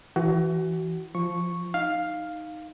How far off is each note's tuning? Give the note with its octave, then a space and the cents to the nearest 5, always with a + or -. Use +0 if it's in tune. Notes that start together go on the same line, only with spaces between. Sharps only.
E3 +5 F#4 +30
F3 +0 C#6 -5
D#4 +0 F5 +5